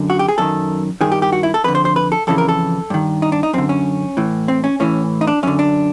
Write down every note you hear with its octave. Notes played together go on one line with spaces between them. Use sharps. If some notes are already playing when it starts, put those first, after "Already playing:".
Already playing: F#2 D3
F#4
G4
G#4
F#2 D#3 A4
G2 D#3 G#4
G4
G4
F#4
E4
A4
F2 D3 B4
C5
C5
B4
A4
F2 C#3 E3 A4
A#4
A4
G2 D#3
D#4
D4
D#4
F#2 D3 C4
C#4
A2 E3
C4
C#4
A2 E3 C#4
D#4
D4
F#2 D3 C#4
D4